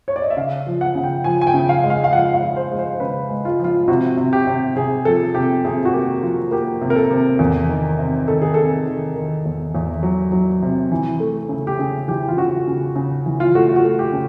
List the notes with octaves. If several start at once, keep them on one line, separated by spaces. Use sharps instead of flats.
C#5
D5
D#5
E5
C#3 F5
F3
F#5
C#3
G5
F3 G#5
G#5
G5
C#3
F5
G#3
F5
F5
F3 F#5
F5
F3
C5
G#3
C5
C#3 B4
G#3
F4
F3 F4
C3 F#4
C3
G4
C3
C3 G#4
F3 A4
C3 G4
C3 G#4
F#4
A#3 G4
F3 F4
A#3 G4
C3
A#4
A4
C3
E2
D#3
C3
D#3 A4
G#4
C3 A4
D#3
D#3
E2
E2
F#3
F#3
C3
E3
A3
C#3
G4
C#3 G#4
E3 G4
F4
C#3 F#4
C#3
C#3
E3
F4
A3 F#4
F#4
A3
G4
C#3